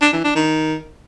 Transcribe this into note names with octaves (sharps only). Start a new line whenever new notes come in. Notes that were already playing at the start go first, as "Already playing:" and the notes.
D4
E3
D4
D#3